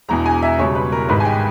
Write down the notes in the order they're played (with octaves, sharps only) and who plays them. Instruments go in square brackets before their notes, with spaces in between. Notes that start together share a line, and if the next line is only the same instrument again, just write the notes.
[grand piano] E1 E2 B2 A#5
G#5
E5
C#2 B2 G3 C#5
B4
A#4
G#1 G#2 G3 B4
G#5
G5